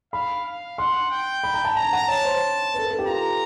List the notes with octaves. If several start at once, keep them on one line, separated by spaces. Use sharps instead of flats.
F5 B5
F5
F#5 C6
G5
B5
A#5
A5
G#5 A#5
F#5
C#5 A5
C5
B4
A4
A#4
A4
G4
F4 A#5